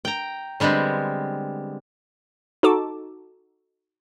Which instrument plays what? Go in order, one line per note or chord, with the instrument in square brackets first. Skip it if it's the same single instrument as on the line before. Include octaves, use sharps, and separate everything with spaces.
[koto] G5 A#5
D3 G3 G#3 B3 C4
[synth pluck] D#4 F#4 A4 A5 D6